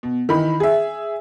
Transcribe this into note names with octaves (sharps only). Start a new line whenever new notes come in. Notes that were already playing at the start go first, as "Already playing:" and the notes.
B2
D#3 E3 B5
G#4 E5